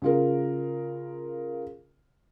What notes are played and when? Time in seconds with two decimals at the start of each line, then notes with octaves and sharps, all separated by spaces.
0.02 C#3 F4 A#4